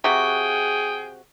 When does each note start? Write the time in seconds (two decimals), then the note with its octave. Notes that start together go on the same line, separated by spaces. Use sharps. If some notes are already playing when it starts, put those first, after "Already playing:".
0.04 C3 F#4 G#4 G5